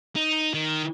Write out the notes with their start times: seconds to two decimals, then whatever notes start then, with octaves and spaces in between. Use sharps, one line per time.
0.16 D#4
0.54 D#3